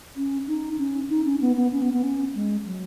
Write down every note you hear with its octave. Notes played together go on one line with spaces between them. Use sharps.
C#4
D#4
C#4
D#4
C#4
B3
B3
C#4
B3
B3
C#4
G#3
F#3